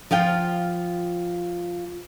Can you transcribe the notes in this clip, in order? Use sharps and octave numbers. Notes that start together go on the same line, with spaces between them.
F3 F4 F5 G5